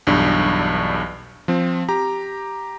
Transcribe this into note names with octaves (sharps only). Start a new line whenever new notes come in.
B1 E2 G2 D4
F3 C4
G4 A#5